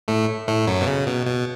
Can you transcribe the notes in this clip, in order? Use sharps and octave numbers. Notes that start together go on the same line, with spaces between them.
A2 A3
A2 A3
F#2 F#3
B2
C#3
B2
B2